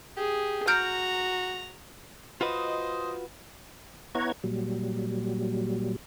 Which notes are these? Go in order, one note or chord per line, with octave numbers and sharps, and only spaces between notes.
G4 G#4
F#4 A#5 F6 G6 D7
F4 F#4 B4 C5 D#5
B3 E4 C#5 F#5 A#5 G#6
A#2 F#3 G3